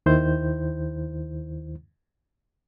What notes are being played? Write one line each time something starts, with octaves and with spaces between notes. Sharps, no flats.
D#2 D#3 E4 C5 G6